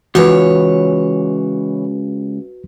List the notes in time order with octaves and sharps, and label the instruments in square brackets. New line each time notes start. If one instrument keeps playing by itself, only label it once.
[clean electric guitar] C#2 [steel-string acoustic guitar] E3 C#5 [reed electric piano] F#4 B4